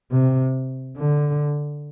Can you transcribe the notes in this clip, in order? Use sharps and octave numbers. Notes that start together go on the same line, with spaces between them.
C3
D3